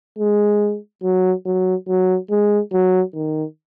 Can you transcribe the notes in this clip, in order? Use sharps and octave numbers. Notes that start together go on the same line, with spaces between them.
G#3
F#3
F#3
F#3
G#3
F#3
D#3